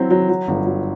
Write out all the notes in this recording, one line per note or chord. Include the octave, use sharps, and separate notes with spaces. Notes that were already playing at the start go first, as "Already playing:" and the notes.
Already playing: F#3 C4 E4
F#3
F#3
G1
F#3